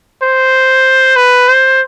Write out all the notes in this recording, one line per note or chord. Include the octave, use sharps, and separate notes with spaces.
C5
B4
C5